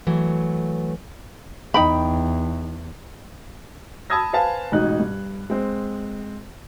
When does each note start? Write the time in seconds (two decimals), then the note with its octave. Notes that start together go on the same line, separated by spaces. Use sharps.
0.07 E3 F#3 A3
1.74 E2 D#4 G5 B5
4.10 A5 B5 D#6 E6 G#6 A#6
4.33 B4 C5 F5 G#5 A5
4.72 A1 G#2 B2 D#4 F#6
5.00 G2
5.50 G#3 C4